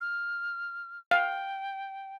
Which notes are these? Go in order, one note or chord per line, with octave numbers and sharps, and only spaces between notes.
F6
F5 G5